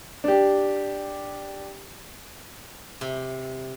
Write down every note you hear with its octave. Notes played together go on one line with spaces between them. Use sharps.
D4 G4
C3